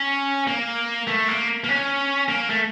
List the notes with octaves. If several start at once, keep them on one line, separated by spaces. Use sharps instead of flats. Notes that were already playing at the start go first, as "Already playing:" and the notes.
Already playing: C#4
A#3
A3
A#3
A#3
C#4
A#3
A3